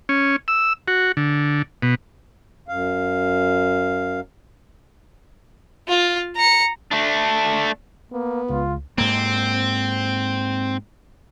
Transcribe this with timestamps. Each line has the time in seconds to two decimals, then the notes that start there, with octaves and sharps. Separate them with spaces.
0.09 C#4
0.48 E6
0.88 F#4
1.17 D3
1.82 B2
2.68 F#2 F5
5.88 F4 F5
6.37 A#5 C#7
6.91 A3 D4
8.12 A#3 B3
8.50 C#2 F4
8.98 G#2 A#3 C4